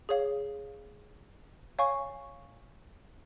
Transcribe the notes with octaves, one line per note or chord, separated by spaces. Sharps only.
G#4 C#5 F5
C#5 F5 G#5 C#6